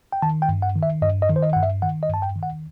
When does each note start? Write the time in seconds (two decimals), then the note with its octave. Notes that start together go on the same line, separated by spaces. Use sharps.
0.12 G5
0.22 D#3 A5
0.42 G5
0.49 G2
0.62 F#5
0.76 D#3
0.83 E5
1.02 G2 D#5
1.22 D#5
1.29 D#3
1.36 C5
1.43 D#5
1.53 G2 F#5
1.63 E5
1.82 D#3 F#5
2.03 D#5
2.09 G2 A5
2.22 G5
2.36 D#3
2.43 F#5